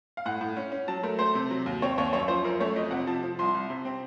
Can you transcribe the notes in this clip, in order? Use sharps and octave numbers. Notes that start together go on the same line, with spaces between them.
F5
A2 F#5
A2
C#4
C#4
F#3 A5
A3 A#4
A3 C5
C3
F#3
D#2
C4 C#5
D#2 C#5
F#2 C#5
F3 C5
F#2 A#4
A3 C#5
F2 D#5
C3 F#5
F3 A5
F3
C2 C6
C2
C3
C4